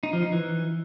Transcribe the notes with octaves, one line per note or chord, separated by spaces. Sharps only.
D#4
F3
D#4
E3